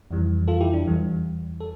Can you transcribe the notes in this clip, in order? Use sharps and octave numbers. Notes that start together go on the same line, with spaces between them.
F2 E3 G3
F4 A4
E4 G4
D4
E2 E3 G3
A4